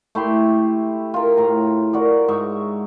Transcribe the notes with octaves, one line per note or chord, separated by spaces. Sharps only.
A3 E4 G4 C6
F4 A#4
A2 A#5
F#4 A#4 D5
G#2 E5 C#6